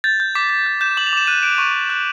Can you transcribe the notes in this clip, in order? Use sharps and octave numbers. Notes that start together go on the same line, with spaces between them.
G6 A6
G6
D6 B6
D6
G6
G6 E7
D6 F#7
F7
D6 E7
F#6 D#7
F#6 D7
C#6 D#7
C#6
F#6